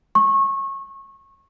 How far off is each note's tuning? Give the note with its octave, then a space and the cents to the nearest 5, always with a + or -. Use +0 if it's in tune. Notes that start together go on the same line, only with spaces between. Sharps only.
C#6 -25